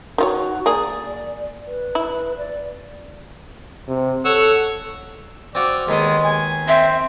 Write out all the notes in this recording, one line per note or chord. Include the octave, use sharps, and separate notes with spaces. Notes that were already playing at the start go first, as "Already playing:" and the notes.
D#3 F4 F#4 C#5
A#3 G#4 D5
B4
E4
D5
C3
A4 C#5 F#5 E6
C4 F4 F#4 D5
D#2 G#3 B3 D#5
G#5
C4 E5